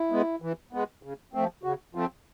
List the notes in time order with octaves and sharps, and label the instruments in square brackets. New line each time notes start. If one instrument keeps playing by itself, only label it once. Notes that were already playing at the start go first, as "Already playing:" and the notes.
Already playing: [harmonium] E4
[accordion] G#3 B3
E3
G#3 B3
C#3
F3 A3 C4
[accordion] C#3 [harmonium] F#4
[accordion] F3 A3 C4 [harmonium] F4